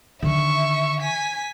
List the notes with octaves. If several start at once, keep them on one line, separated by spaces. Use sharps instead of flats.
D3 D#3 E5 C#6
G#5 B6